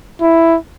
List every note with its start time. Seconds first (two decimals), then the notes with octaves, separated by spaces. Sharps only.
0.21 E4